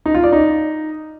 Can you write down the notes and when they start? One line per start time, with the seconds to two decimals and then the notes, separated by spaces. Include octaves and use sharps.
0.06 D#4
0.15 F4
0.24 D5
0.33 D#4